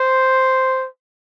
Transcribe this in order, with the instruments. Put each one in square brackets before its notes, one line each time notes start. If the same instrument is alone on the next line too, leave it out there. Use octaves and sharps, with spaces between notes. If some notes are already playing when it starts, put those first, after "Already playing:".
Already playing: [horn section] C5